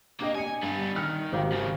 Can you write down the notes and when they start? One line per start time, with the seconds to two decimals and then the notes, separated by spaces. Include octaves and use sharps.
0.20 A#3 D4 G4 D#5
0.35 G#5 D#6 C#7
0.63 G2 G3 B3
0.96 D#3 F6 B6 C#7
1.32 G#1 G4 F5
1.53 F#2 C#3